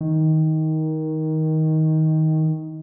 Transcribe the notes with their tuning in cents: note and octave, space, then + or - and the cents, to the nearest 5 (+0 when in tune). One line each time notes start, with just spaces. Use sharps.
D#3 +15